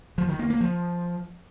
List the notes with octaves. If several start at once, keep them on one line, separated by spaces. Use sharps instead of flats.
F3
D#3
A#3
A#3
F3